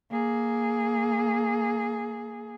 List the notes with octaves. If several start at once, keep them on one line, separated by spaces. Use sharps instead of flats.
A#3 G#4